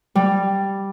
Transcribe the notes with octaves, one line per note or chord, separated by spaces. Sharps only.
G3